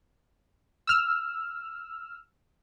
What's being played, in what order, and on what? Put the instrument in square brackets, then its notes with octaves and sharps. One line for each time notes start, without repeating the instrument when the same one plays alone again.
[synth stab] E6 F6